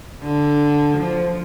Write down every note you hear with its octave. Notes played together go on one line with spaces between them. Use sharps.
D3
F3